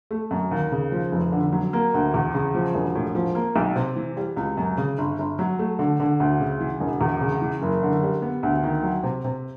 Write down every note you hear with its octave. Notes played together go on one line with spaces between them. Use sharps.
A3
F#2
D#2
C#3
F3
F1
D3
F#3
A#3
D2
E2
C#3
F3
E1
A2
F3
A#3
B1
C3
E3
G3
C#2
F#2
C#3
G1
G1
F#3
A3
D3
D3
D2
C#3
E3
E1
E2
C#3
E3
F#1
D3
G3
B3
D2
D#3
F#3
C3
C3